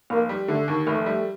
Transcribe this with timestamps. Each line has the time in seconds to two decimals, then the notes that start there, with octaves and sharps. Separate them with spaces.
0.10 F1 A#3
0.29 G3
0.48 D3 A3
0.68 D#2
0.87 F1 A3
1.06 G3